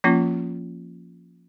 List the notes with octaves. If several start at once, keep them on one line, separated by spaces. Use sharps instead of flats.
F3 A#3 C#4 F4